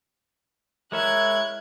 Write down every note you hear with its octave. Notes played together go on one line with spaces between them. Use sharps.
G#3 E4 A#4 C#5 E5 F#6 G#6